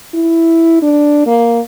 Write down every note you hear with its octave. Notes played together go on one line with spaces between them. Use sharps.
E4
D4
A#3